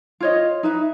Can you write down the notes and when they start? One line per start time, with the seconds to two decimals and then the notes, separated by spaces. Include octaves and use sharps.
0.20 F4 C#5 D#5
0.63 D#4 B4 E5